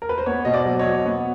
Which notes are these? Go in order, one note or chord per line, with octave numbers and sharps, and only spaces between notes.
A#4
B4
C5
B3 B4 C#5
B2 D#5
C5 D5
F#3
C#5 D#5
B2
B3